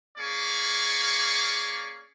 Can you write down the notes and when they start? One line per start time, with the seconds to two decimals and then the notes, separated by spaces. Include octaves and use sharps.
0.18 A#3 C#4 G#4 D5 C#6